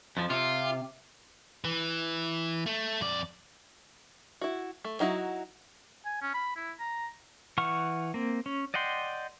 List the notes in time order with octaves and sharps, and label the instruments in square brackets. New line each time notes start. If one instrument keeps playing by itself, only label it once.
[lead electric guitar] F2 F3
[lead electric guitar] C3 [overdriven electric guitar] F4
[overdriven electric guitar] E3
A3
F2 D5
[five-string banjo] E4 F#4
A3
F#3 D#4 E4 F#4
[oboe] G#5
C#4
B5
E4
A#5
[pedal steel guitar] E3 F#5 C#6 F6
A#3 C4
C#4
D5 D#5 F#5 G5 C6